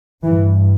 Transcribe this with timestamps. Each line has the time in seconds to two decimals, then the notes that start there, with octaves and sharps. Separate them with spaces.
0.24 G2 E3